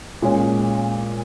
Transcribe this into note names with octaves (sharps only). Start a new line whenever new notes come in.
A#2 G#3 C#4